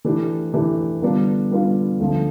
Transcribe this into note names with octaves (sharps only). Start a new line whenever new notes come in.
E3 A3 D4 G4
E3 A3 D4 G4
D3 G3 B3 D4 F4
D3 G3 B3 D4 F4
D2 D3 F3